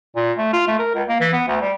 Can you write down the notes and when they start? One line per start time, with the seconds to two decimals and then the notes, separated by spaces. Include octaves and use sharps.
0.16 A#2
0.38 A3
0.53 F4
0.67 A3
0.79 A#4
0.95 C#2
1.08 A#3
1.20 E3
1.33 B3
1.48 D2
1.61 G3